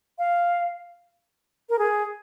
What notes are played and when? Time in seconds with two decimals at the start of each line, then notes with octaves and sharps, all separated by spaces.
0.19 F5
1.69 A#4
1.79 G#4